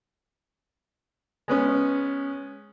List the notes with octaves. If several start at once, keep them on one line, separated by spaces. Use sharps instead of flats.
G#3 B3 C#4